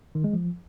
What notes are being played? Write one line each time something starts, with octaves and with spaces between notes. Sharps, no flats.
D#3
G#3
F3